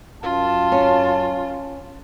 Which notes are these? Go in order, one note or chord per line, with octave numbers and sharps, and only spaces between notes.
F#2 F4 A5
C#4